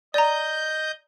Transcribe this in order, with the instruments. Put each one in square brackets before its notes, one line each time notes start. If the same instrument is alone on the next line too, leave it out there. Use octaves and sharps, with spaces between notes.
[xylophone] D5 A#5 [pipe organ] D#5 G6